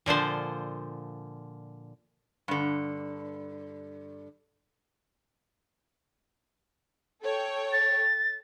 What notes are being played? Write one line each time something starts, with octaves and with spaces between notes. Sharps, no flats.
A#2 D3 F3 C5
G2 D3
A4 C#5 G5
A6